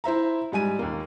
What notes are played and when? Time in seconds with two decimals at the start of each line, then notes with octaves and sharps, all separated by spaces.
0.04 E4 C5 E5 A#5
0.52 G#2 G3 G#5 D#7
0.79 D#2 A#3